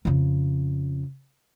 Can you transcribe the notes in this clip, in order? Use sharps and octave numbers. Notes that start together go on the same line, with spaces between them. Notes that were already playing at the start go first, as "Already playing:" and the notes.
F2 C#3